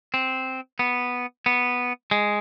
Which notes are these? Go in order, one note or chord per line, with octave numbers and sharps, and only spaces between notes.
C4
B3
B3
G#3